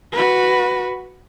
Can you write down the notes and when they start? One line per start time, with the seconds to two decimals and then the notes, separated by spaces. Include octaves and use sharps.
0.12 F#4 B4